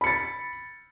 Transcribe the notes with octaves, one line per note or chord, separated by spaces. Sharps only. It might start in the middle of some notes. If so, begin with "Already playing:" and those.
B5 A6 C#7